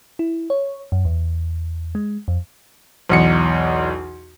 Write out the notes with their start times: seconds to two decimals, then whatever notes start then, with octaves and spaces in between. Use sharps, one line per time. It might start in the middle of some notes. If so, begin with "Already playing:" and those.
0.19 E4
0.50 C#5
0.92 F#2
1.05 E2
1.95 G#3
2.28 F2
3.09 B1 E2 C#7